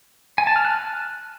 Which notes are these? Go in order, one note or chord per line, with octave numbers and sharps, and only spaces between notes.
G#5
A5
F6
F#6